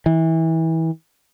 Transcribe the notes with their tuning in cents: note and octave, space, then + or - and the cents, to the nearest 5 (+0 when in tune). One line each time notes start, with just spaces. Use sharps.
E3 -25